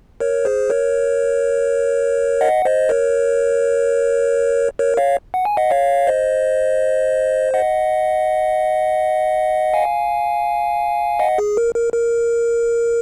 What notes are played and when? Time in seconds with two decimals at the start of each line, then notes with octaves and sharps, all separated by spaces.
0.20 A#4 C#5
0.45 G#4 C5
0.70 A#4 C#5
2.41 D#5 F#5
2.65 C5 D#5
2.89 A#4 C#5
4.79 A#4 C#5
4.97 C#5 F5
5.34 F#5
5.45 G#5
5.57 D#5 F#5
5.70 C#5 F5
6.07 C5 D#5
7.54 D#5 F#5
9.73 F5 G#5
11.19 D#5 F#5
11.38 G#4
11.57 A#4
11.75 A#4
11.93 A#4